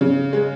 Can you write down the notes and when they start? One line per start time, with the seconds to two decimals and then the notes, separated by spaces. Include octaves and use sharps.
0.01 C#3
0.33 G#3